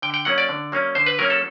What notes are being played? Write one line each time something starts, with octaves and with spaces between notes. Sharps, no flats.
D3 G5
G5
F#3 A#3 C#4 F#5
D5
D3
F#3 A#3 C#4
D3 C5
B4
F#3 A#3 C#4 A#4
A4